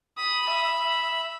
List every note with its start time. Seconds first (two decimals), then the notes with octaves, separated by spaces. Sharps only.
0.18 B5 D#6
0.50 E5